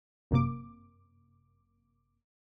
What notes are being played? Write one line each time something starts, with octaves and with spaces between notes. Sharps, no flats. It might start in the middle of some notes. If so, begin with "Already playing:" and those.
G1 F#2 C3 A#3 D6